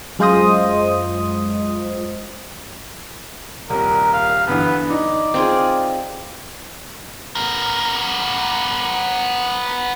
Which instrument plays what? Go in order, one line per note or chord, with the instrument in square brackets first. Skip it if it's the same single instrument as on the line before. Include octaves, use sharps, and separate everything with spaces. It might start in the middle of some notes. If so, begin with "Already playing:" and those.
[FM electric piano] F#2 G#3 F4 C5 D#5 D#6
[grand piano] D#1 C2 [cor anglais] A#4
[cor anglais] F5
[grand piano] G2 D3 E3 [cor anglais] B3
[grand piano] D#4 [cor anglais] D5
[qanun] C4 F4 G#4
[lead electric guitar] B3 A#4